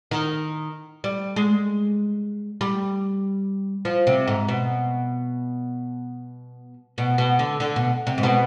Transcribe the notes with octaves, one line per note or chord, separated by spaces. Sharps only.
D#3
G3
G#3
G3
F3
C3
G#2
B2
B2
B2
D3
D3
B2
C3
G#2
B2